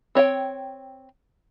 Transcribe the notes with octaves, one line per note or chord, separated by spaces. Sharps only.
C4 C#5 D#5 G5